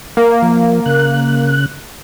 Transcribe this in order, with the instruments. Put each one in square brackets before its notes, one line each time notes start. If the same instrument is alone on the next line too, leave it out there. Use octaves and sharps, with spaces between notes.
[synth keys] A#3
[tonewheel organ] F3
C#3 F#6